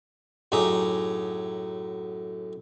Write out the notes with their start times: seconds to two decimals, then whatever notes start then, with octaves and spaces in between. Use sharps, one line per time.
0.52 F#2 A2 D#4 G4 G#4 G#5